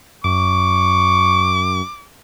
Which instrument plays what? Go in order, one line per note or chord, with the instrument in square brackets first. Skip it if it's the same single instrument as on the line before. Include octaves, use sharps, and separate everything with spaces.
[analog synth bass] F#2 [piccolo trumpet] C#6 [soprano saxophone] D6